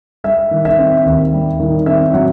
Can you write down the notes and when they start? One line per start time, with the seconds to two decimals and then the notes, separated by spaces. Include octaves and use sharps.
0.24 G3 E5
0.51 D#3
0.65 E5
0.79 C4
1.06 D#2
1.33 G3
1.60 D#3
1.86 C4 E5
2.14 F#3 F#5